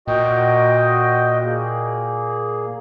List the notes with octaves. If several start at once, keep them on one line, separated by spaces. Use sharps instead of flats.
A#2 F#4 D#5 G5
A#3 G#4